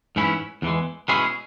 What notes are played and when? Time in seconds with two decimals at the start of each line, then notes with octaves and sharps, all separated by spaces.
0.16 G#2 E3 C#4 E4
0.62 E2 E3 G#3
1.08 B2 G#3 C#4 E4 G#4